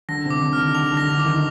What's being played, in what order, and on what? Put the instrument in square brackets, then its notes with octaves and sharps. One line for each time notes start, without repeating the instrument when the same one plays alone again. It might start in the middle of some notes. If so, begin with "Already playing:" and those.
[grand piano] D3 [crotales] A#6
[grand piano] C3 [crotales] D6
[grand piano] D3
[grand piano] D#3 [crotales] F6
[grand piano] D3 [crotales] F7
[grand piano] D3
[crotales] A#6
[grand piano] D3
[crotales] D6
[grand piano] D#3